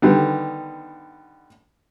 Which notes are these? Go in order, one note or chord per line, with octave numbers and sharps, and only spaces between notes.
D3 D#3 G3 B3